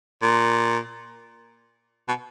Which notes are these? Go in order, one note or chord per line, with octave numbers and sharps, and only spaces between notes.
A#2
B2